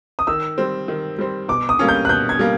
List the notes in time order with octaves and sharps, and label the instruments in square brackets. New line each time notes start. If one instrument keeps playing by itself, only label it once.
[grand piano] D#6
[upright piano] D#3 [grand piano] E6
[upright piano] G3 C4
D#3
G3 C4
[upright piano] B2 [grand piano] D6
[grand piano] D#6
[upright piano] G3 A#3 C#4
[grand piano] G6
F#6
[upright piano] B2 [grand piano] G6
[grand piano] G#6
[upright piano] G3 A#3